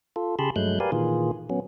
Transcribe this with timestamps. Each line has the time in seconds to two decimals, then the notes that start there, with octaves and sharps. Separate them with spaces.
0.16 F4 A4
0.39 C#3 G4 G#4 A5 B5 C6
0.56 G2 F#3 G#3 A3 F#6 G6
0.80 G4 A#4 B4 D5 F5 G#5
0.92 A#2 D#3 E3 F4 G#4
1.50 F#3 B3 C#4